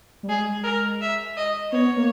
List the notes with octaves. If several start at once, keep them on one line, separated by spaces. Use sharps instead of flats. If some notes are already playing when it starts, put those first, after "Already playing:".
G3
G#3 G#4
A#4
E5
D#5
B3 C#5
A#3